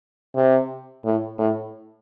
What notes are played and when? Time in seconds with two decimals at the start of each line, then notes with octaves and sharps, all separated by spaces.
0.35 C3
1.05 A2
1.39 A2